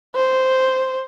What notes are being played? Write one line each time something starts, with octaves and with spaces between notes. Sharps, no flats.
C5